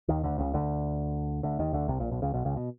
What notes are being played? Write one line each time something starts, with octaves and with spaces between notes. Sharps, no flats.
D#2 D#3
D2 D3
C#2 C#3
D2 D3
D2 D3
D#2 D#3
D2 D3
C2 C3
A#1 A#2
B1 B2
C#2 C#3
B1 B2
C#2 C#3
B2